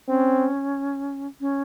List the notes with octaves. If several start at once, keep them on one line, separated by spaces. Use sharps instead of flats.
C4 C#4
C#4